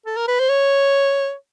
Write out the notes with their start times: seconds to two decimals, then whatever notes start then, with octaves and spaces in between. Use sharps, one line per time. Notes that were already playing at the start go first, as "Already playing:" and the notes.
0.06 A4
0.17 A#4
0.28 B4
0.39 C5
0.50 C#5